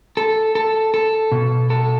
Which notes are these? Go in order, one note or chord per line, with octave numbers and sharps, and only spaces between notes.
A4
A4
A4
B2
A4